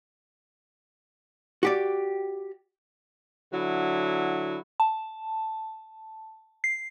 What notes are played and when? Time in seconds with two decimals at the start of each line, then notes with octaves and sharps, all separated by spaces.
1.63 F#4 G4 D5
3.53 D3 F#3 E4
4.80 A5
6.64 C7